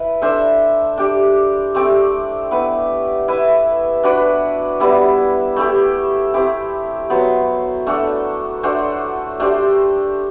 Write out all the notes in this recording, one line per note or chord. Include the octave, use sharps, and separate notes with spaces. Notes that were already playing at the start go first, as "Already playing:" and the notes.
Already playing: E4 B4
D4 A4 C5 E5
D4 G4 D5
A3 C4 G4 D5
B3 E4 B4
E4 B4 E5
D4 F#4 B4 D5
G3 B3 E4
A3 E4 G4
C4 E4 G4
F#3 B3 F#4 C5
A3 D4 F#4 A4
A3 D4 F#4 C5
A3 D4 G4 C5